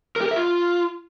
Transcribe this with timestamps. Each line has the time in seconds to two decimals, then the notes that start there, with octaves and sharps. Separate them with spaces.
0.16 A#4
0.21 G4
0.26 A#4
0.31 E5
0.36 F4